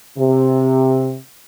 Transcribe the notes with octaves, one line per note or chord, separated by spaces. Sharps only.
C3